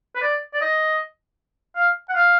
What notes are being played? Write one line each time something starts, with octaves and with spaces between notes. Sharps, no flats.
B4
D5
D5
D#5
F5
F#5
F5